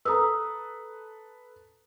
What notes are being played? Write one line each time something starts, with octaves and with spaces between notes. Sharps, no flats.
A4 B4 A#5 D#6 E6